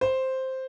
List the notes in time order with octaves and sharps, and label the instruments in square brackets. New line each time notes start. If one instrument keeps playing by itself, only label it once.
[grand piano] C5